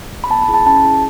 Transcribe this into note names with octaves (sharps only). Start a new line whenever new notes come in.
B5
B3 A5
B5
E4 G#4
A5
C#4 A5
E4 G#4